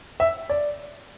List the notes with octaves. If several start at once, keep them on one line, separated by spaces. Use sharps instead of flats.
E5
D5